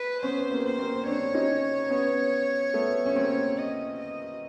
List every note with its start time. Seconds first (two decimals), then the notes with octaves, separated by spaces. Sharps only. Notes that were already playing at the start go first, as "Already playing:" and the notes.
Already playing: B4
0.23 B3 C#4 C5
0.51 A#3 C4
0.65 C5
0.79 A#3 C4
1.06 C4 D4 C#5
1.34 C#4 D#4
1.90 B3 C#4
2.74 A3 B3
3.06 C#4
3.15 A#3 C4
3.58 D#5
4.00 D#5